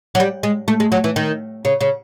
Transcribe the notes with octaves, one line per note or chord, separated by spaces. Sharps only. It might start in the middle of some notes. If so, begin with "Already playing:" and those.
F#3
G3
G#3
A3
G#3
F#3
E3
D#3
C#3
C#3